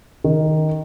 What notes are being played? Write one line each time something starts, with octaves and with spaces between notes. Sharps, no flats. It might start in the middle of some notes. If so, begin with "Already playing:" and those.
D#3